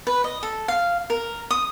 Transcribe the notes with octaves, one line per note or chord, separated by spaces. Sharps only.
B4
D#5
A4
F5
A#4
D#6